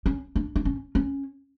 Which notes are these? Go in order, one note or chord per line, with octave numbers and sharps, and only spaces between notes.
C#4
D4
D4
C#4
C#4